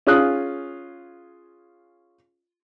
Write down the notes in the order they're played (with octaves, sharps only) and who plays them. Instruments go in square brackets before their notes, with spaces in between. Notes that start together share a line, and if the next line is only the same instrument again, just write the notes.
[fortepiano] C#4 F4 G#4 F5 D#6 F#6